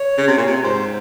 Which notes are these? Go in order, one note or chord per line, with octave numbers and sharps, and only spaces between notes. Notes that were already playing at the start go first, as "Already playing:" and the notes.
Already playing: C#5
C#3
C3
A#2
C3
G#2 C5